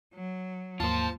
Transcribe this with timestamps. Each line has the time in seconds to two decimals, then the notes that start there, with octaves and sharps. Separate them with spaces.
0.14 F#3
0.80 D#2 G#2 A#3 F4 C5 A5